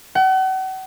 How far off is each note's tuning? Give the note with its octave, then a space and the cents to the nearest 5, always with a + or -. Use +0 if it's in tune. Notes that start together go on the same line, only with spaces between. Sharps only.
F#5 +40